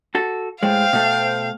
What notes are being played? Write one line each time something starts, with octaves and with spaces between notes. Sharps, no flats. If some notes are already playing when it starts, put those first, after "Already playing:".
F#4 A4
A2 G#3 C5 F5 G5
B2 A3